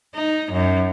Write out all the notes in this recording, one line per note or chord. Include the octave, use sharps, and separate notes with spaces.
D#4
F#2